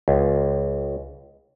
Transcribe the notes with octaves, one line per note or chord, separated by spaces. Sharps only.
C#2